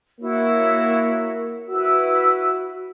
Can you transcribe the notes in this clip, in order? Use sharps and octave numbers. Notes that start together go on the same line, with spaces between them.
A#3 E4 F#4 C#5
E4 F#4 B4 E6